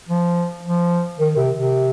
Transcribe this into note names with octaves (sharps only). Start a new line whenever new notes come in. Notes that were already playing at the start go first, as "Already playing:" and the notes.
F3
F3
D#3
C3
C3